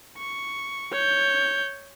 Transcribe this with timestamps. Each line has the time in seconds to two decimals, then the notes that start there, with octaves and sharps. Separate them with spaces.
0.18 C#6
0.93 C#5 G6